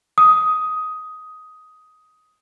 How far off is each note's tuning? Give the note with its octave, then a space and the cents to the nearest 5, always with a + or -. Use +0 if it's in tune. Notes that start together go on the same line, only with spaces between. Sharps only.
D#6 +10